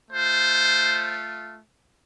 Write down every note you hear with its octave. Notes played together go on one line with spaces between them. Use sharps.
A3 F4 C5